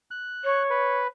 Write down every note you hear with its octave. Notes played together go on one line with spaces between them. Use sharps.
F#6
C#5
B4